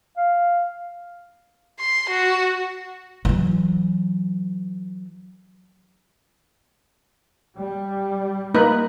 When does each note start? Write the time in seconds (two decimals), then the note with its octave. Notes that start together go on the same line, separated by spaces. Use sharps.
0.17 F5
1.80 C6
2.10 F#4
3.25 E3 F#3
7.58 G3
8.54 A#3 D#4 B4